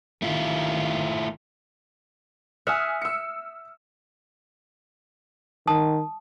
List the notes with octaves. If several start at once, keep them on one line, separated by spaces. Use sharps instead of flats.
G#1 D#3 A3 E4 F4
E5 F#5 G#5 D#6 F6
E6 C#7
D#3 A5 D#6